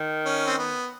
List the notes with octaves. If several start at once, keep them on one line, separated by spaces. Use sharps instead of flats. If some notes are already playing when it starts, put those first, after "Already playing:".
Already playing: D#3
C#4
C4
B3